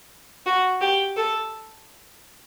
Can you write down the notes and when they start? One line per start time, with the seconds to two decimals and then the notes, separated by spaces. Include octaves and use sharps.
0.46 F#4
0.81 G4
1.17 A4